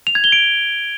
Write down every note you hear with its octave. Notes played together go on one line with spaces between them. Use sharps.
F7
G#6
G7
D7